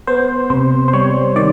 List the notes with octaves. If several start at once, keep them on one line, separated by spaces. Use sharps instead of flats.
B3 C5
C3 C5
C5
G3 C#5
D#3 D5